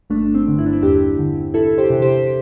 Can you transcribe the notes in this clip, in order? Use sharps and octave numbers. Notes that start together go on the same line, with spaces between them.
G1 A3 D4
D4
C4
G2 D3
E4
D4
C4 E4
E2 D4 G4
D3
C2 E4 A4
G4 C5
C3 E3
G4 C5
G4